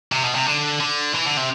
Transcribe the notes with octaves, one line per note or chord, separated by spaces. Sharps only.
C3
B2
C3
D3
D3
E3
D3
C3